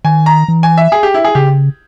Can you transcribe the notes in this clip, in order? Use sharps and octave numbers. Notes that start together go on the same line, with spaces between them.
D#3 G#5
A#5
E3
G#5
E5
G#4
G4
E4
G#4
C#3 G4